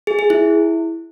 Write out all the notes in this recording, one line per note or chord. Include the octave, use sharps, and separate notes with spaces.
G#4
G#4
E4